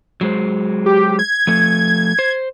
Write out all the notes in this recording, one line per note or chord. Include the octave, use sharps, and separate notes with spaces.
F#3 G#3 C5
G4
G#6
F3 A3
C5